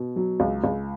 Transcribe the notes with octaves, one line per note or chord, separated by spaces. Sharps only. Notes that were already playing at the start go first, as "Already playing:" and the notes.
Already playing: B2
F#3
C#2
C#2